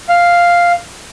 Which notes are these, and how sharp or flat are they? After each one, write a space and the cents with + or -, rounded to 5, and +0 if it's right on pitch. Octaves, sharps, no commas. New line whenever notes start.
F5 +0